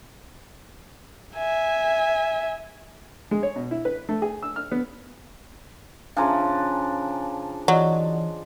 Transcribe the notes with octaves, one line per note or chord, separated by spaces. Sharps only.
E5 G#5
G#3
C#5
B2
E4
B4
A3
G#4
E6
F6
B3
C#3 F3 D4 F5 G#5 A#5
E3 F#3 D5 D#5